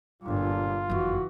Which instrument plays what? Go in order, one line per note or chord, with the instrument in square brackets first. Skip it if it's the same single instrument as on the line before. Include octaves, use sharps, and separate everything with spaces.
[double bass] G1 G2 [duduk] A#2 [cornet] F4
[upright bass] F#1 F2 [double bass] E3 [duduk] F#4